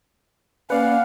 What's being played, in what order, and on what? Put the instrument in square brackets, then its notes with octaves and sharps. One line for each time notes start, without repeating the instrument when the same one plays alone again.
[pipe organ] A#3 C#4 [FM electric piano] B4 D5 [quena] F5 [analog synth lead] F#5